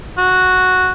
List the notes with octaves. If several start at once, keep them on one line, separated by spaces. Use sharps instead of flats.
F#4